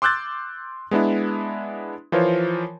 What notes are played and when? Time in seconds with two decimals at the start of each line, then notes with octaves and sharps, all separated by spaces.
0.02 C6 D6 E6 F#6 G6 A6
0.91 G#3 B3 D4 E4
2.12 E3 F3 F4 A#4 C5 C#5